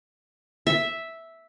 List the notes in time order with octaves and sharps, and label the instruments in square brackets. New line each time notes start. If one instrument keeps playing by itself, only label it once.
[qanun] E5